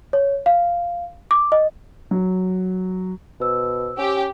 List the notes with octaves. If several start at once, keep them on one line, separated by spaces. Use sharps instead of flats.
C#5
F5
D6
D#5
F#3
B2 C5 E6
C#4 G4